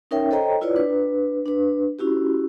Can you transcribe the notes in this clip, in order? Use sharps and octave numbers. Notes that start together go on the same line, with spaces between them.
C#4 D#4 A#4 C#5 E5 G5
A4 C5 C#5 D#5 G5 A#5
E4 F4 B4 C#5 D5
D4 B4
D4 B4
C#4 E4 F#4 G4